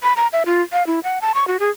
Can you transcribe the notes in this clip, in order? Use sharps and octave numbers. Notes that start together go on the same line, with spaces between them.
B5
A#5
E5
F4
F5
E4
F#5
A5
C#6
F#4
G#4